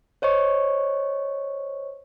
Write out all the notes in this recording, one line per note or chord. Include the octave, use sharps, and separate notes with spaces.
C5 C#5 D#5 C#6